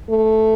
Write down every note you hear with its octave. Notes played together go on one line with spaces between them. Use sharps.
A3